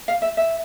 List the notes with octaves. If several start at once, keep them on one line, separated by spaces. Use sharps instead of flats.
F5
E5
E5